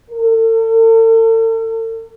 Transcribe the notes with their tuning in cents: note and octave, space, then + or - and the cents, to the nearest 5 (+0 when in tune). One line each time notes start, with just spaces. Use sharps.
A4 +45